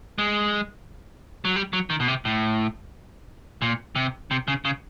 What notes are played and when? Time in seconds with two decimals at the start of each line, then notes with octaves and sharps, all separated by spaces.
0.18 G#3
1.45 F#3
1.56 G3
1.73 F#3
1.90 D#3
2.00 B2
2.08 C3
2.25 A2
3.62 A#2
3.96 C3
4.31 C3
4.48 C#3
4.65 C#3